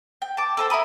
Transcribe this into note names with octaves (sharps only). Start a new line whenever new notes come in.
G5
A5 D6
A4 B4 C5
E4 A#4 B5 D#6